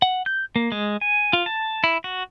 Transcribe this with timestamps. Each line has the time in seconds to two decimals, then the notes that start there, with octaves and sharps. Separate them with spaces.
0.02 F#5
0.26 G6
0.56 A#3
0.72 G#3
1.01 G#5
1.33 F4
1.46 A5
1.84 E4
2.04 F#4